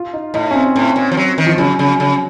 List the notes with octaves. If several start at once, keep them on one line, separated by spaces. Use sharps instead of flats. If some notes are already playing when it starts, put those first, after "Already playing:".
Already playing: F4
D#4
A2 D#4
C#4
C4
A2
A#2
F3
F#3
D#3
F3
C#3 F#3
C#3
C#3